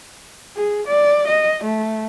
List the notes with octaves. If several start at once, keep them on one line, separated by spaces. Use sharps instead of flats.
G#4
D5
D#5
A3